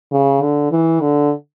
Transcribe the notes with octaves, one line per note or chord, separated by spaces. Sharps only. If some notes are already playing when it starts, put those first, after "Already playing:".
C#3
D3
E3
D3